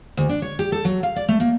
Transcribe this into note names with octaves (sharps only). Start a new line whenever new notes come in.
D2
D4
C#5
G4
A4
F#3
F5
D5
A3
A#3